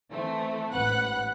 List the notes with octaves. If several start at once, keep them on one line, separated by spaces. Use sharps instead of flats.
E3 A3 C4
A1 G#2 B4 F#5 F#6